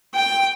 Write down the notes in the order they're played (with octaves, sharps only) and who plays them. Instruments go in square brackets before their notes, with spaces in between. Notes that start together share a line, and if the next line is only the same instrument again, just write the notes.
[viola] G5